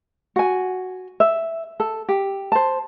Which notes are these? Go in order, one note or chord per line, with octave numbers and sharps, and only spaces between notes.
F#4 G#5
E5
A4
G4
C5 A5